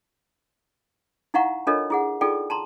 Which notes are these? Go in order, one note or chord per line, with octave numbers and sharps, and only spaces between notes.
D#4 E4 F5 F#5 A#5 C#6
D4 F4 A4 A#4 C#5 D#5
E4 G#4 F#5
D#4 F4 G#4 A4 D5 G5
A5 A#5 C6